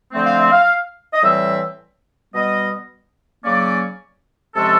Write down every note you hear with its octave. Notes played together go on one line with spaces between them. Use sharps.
D3 F3 A3 C4
F5
E5
F5
D#5
A2 E3 G3 C4 E5
B2 G3 B3 D#5
C#3 F#3 A#3 C#4 D5
C3 F3 G#3 C#4 A4